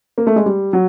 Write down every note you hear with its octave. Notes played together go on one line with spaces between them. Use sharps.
A#3
A3
G#3
G3
F#3